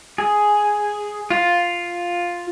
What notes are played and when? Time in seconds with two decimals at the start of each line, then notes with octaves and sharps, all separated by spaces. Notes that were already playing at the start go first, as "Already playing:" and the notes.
0.18 G#4
1.30 F4